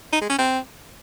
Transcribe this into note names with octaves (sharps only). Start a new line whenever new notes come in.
D#4
G#3
C#4
C4